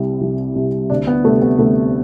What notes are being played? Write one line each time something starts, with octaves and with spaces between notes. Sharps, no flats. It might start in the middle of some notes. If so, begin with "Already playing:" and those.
Already playing: C2 C3 G3
C2
C3 G3
D2 D4
B3
C3 G3 A3
B3
D2 A3